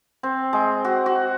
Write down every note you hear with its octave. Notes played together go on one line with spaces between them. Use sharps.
C4
G#3
F#4
F#4